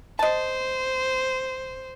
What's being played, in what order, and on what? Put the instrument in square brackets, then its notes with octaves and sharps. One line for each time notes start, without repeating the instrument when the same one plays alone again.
[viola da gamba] C5 [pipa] D#5 A5